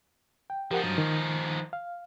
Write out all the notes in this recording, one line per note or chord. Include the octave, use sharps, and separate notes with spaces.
G5
F3 D#4 G4 A#4 F#5
G2 F#3 A6
D#3
F5